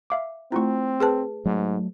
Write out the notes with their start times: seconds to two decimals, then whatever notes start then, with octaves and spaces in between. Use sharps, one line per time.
0.10 E5 F5 D6
0.52 A3 C4 E4 F4 A#5 C#6
1.00 G#4 B4 A5
1.45 G#2 F#3 A3